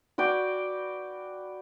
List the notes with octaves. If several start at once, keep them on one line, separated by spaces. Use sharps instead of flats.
F#4 B4 D5 G5